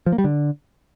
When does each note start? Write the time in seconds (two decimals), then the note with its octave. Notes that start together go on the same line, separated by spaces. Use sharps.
0.06 F3
0.12 A#3
0.18 G3
0.24 D3